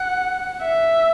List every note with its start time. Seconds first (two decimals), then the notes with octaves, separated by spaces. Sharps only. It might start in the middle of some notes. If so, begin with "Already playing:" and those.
Already playing: F#5
0.62 E5